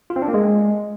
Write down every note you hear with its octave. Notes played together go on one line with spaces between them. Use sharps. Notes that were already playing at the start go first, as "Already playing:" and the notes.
F4
C4
D4
A#3
G#3